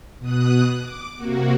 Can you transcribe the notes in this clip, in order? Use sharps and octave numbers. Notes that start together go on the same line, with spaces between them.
B2 D#6 F#6
D6
C3 A#3 F#4